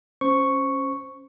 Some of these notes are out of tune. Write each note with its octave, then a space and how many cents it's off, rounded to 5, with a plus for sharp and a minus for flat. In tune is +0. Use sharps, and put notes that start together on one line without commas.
C#4 -15 C5 +0 C#6 +0